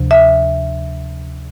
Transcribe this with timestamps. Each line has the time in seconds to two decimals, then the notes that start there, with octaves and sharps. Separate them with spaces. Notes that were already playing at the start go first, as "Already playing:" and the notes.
Already playing: D2 C3 F3
0.11 E5